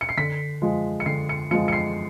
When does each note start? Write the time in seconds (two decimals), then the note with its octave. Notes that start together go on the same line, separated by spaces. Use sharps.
0.01 C#7
0.09 C7
0.17 D3 B6
0.62 F3 G#3
1.00 C#7
1.06 D3 C7
1.29 C#7
1.51 F3 G#3 C#7
1.68 C#7
1.73 C7